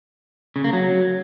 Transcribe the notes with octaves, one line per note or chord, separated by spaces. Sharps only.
C#3
A#3
F#3